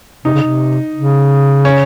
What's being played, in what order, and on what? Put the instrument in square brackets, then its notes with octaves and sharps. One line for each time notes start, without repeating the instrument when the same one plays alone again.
[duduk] C3 [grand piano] D#4
[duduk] C#3
C3
C#3
[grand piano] C#4